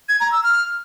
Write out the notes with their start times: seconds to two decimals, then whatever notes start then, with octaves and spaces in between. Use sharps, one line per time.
0.09 G#6
0.20 A#5
0.32 E6
0.43 F6